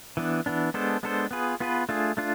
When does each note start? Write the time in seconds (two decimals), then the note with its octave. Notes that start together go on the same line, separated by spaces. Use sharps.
0.17 E3 B3 D4
0.46 E3 B3 D4
0.74 G#3 B3 D4 A4 C5
1.03 G#3 B3 D4 A4 C5
1.31 B3 F4 G#4 B4
1.60 B3 F4 G#4 B4
1.89 A3 D4 F4 G#4
2.17 A3 D4 F4